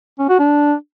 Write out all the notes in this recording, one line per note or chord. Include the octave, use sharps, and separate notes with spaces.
C#4
F#4
D4